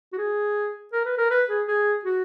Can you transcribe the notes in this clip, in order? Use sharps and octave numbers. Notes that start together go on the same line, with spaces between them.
F#4
G#4
A#4
B4
A#4
B4
G#4
G#4
F#4